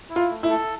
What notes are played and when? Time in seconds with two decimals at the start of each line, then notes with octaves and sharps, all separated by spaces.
0.10 E4
0.16 F4
0.30 A3
0.43 E4
0.50 A4